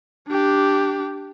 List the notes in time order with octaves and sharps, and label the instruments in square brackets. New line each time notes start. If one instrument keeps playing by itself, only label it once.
[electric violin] D4 G4